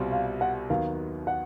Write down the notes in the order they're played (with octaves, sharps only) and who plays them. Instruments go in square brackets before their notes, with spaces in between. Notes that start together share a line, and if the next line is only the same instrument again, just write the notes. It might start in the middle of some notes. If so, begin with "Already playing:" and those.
Already playing: [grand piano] C2 B2 G3 C4 F4
[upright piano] F5
F#5
[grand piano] D#2 D#3 F#3 B3 [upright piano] F5
[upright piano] F#5